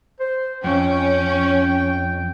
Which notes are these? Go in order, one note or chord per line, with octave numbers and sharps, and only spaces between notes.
C5
F2 C#4 G5